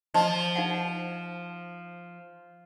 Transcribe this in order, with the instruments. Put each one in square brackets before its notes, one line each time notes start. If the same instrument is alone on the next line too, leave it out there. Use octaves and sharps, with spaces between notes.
[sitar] F3 [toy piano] D5 D#5 A5
[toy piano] D#4 F5 F#5